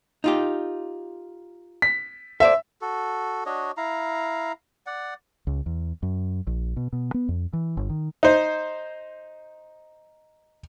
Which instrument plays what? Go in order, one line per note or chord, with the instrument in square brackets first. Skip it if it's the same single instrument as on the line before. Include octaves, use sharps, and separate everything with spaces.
[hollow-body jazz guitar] D#4 F4 G4
[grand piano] B6
[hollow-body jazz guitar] A4 C5 D5 [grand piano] E5
[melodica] F#4 A4
D4 F#4 C#5 D#5
E4 F5 A#5
D5 F#5
[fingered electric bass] C#2
E2
F#2
A#1
B2
B2
B3
F2
E3
G1
D#3
[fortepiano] D#4 C5